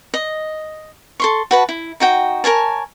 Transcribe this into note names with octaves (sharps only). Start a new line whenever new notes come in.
D#5
A4 C6 C#6
F#4 B4 A5
E4
D#4 F#4 G5
A#4 C#5 G#5 A5